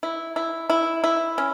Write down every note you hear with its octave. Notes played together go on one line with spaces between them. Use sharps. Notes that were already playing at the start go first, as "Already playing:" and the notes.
E4
E4
E4
E4
C#4